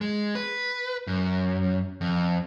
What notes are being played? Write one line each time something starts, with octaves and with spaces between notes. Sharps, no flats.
G#3
B4
F#2
F2